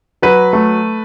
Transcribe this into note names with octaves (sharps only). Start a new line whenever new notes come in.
F#3 B4
A3